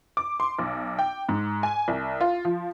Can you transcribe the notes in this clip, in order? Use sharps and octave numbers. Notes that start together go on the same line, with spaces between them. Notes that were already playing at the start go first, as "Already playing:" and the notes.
D6
C6
B1
G5
G#2
G#5
C2
F4
F3